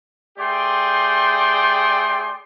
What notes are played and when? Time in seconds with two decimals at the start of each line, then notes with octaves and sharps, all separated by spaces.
0.38 A3 G4 G#4 D5 G5 C6